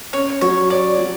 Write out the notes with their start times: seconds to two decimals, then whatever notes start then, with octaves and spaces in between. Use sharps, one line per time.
0.13 C#4 C#5
0.41 F#3 C#5
0.70 C#5 D5
0.99 F#3